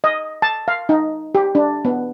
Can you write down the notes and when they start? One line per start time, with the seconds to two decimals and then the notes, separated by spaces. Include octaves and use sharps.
0.04 D#5
0.42 A5
0.68 F5
0.89 D#4
1.35 G4
1.55 D4
1.85 B3